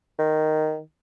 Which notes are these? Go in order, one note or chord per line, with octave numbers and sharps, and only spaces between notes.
D#3